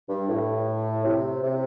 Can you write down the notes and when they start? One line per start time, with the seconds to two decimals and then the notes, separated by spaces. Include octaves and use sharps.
0.09 G2
0.29 A2
1.05 C3
1.43 C3